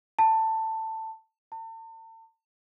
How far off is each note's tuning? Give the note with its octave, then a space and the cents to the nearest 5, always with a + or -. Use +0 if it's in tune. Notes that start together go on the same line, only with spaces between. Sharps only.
A5 +15
A5 +40